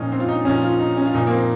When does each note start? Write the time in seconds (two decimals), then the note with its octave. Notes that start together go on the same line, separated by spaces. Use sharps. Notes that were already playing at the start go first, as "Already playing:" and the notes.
Already playing: A#2 F3 C#4 D#4
0.12 C4
0.20 F4
0.28 D#4
0.45 A#2 F3 C#4
0.63 F4
0.79 D#4
0.97 C#4
1.06 F4
1.14 A#2 F3 D#4
1.27 A#3
1.31 C4